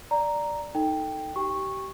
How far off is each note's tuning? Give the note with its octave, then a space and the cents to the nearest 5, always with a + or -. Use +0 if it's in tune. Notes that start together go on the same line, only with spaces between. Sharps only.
D5 +0 A#5 +0
D#4 +0 A4 +0 G5 +0
G4 -25 G5 +35 C#6 -10